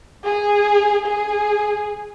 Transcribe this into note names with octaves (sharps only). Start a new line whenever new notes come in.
G#4
G#4